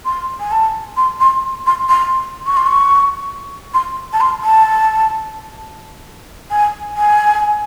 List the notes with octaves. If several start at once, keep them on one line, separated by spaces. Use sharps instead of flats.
C6
G#5
A5
C6
C6
C6
C6
C#6
C6
C#6
C6
A5
C6
A5
G#5
G#5